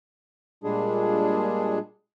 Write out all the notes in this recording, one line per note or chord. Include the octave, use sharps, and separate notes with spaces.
A#2 G3 G#3 D4 G#4